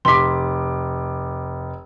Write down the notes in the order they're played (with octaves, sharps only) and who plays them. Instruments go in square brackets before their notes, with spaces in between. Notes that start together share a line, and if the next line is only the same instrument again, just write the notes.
[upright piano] F1 D6 [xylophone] C6 B6